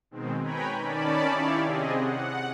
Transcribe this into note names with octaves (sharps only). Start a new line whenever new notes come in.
B2 D#3 G#3 C4
B4 C#5 G5 G#5 A#5 B5
D#3 C#4 D5 A5 B5
E4 G4 C#5 D5 E5 F5
C3 C4 G#4 D#5
F#5